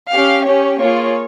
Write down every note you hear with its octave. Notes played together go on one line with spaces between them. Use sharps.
C#4 G4 F5
C#4 G4 C#5
A#3 F4 G#4 C#5